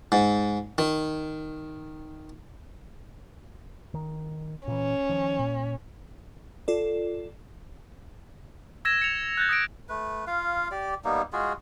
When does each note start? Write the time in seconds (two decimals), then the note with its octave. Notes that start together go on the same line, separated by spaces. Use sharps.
0.12 G#2
0.78 D#3
3.94 D#3
4.68 A#2 E3 C#4
5.09 D#3 F3
5.39 A#2
6.68 F4 A4 D5
8.85 E6 G#6 A#6 E7
9.02 C#7 F7
9.37 F#6 G6 A6
9.49 D#6 A#6 D7
9.89 A3 B4
10.27 F4 F5
10.71 G4 D5
11.05 G3 A#3 B3 D#4
11.33 G#3 F4 F#4 G#4